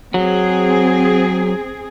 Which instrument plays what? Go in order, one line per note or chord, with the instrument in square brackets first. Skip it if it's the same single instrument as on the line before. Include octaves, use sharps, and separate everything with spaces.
[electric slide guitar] F#3 [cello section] C4 G#4